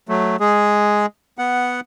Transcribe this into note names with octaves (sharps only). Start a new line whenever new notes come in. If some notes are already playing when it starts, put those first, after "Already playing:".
F#3 A3
G#3 G#4
B3 F#5